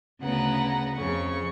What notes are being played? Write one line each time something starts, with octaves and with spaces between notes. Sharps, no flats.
D2 C#3 B3 F#5 A#5
F2 C#3 C#6